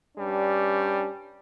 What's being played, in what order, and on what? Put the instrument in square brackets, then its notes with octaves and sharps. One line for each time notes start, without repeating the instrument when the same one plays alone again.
[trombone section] G2 G3 C#4 D4